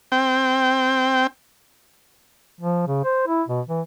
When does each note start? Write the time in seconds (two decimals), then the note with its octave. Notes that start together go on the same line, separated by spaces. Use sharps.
0.12 C4 G5
2.60 F3
2.87 C#3
3.04 C5
3.27 E4
3.48 B2
3.69 E3